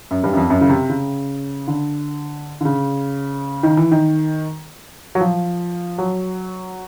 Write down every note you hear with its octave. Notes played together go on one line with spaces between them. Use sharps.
F#2
G2
F#2
F2
F#2
C#3
C3
C#3
D3
D3
C#3
D#3
E3
D#3
F#3
F3
F#3